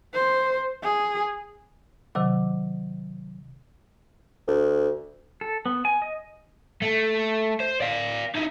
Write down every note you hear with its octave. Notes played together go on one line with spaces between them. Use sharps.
C5
G#4
C3 D#3 F#3 D6
D2
A4
B3
G#5
D#5
A3
C5
D5 F5
D#4 E4